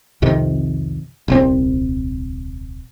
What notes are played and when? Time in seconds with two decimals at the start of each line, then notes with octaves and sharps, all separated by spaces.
0.22 C2 F2 C3 D#3
1.28 D#1 C2 C4